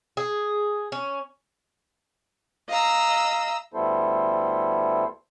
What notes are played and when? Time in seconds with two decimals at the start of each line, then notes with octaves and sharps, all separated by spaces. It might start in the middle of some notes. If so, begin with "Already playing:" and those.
0.17 G#4
0.92 C#4
2.69 D#5 F5 A#5 E6
3.74 D2 G3 B3 E4 A4 C5